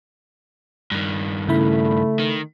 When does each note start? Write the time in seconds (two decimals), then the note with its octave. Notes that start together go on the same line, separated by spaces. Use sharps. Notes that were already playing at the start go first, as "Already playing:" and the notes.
0.92 G2 D#3
1.48 C#3 A3 E4 B5
2.19 D#3